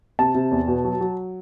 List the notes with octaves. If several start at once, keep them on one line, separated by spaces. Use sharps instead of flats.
C3 A5
C3
E2
B2
F#3
F#3